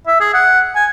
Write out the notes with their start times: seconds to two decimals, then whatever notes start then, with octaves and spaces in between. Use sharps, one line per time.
0.07 E5
0.21 G#4
0.34 F#5
0.76 G#5